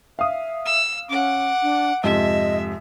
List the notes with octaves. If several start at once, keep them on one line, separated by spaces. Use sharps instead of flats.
E5 F5 D#6
E6
C#4 F#5 D6
D4
F2 G#2 C3 D#5 E5